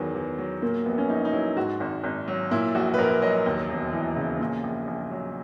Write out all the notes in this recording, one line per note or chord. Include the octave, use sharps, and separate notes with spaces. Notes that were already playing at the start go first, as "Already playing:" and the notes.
Already playing: E2 D#3 F#3 B3
E2
F#3
A#2 A#3
A#1 B3
C#4
A#1 D#4
D#4
F#3 E4
G#2 F#4
G#1
G#1
F#3
A#2 E4
A#1 F#4
B4
A#1 A#4
F#3 D#5
D#2
E1
E3
C#3
A#2
A#1
A#1
F#3